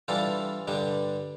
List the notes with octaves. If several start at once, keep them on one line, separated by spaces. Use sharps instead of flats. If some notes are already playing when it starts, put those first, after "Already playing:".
E3 G3 D4 F4 A4
G2 D3 G3 D4